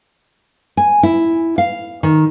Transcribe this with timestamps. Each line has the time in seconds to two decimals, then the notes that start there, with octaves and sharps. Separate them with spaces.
0.77 G#5
1.03 E4
1.58 F5
2.03 D#3